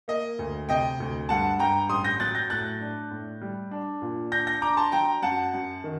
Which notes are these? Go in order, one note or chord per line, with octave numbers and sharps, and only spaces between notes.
A#3 D#5
D2
C3 D#5 G5
D2
G2 F#5 A5
G2 G5 A#5
A1 C6 D#6
G6 A#6
F#3 F#6 A6
G6 A#6
A2 F#6 A6
D4
A2
G3
D4
A#2
D4 G6 A#6
G6 A#6
D4 A#5 D6
A5 C6
F#3 G5 A#5
F#2 F#5 A5
F#2
D#3